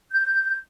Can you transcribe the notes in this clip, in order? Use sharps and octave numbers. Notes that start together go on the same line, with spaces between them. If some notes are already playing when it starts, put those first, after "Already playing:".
G6